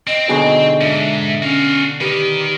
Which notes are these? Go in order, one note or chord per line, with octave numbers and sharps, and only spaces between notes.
C4 D#5
B2 D3 D#4 F#4 G#4
G#2 D4 E5
C#4 F#4 F5
D#3 D#4 G4 B4